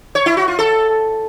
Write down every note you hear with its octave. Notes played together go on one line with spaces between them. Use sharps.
C#5
E4
F#4
F4
A4